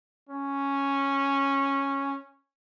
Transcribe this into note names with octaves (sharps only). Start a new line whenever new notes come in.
C#4